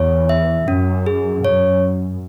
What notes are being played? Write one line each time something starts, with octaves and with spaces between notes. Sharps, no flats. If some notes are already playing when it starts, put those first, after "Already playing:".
Already playing: E2 C#5
E5
F#2 C#4
G#4
F#2 C#5